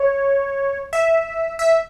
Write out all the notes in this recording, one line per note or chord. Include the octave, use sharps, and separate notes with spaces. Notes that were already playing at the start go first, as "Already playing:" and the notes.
Already playing: C#5
E5
E5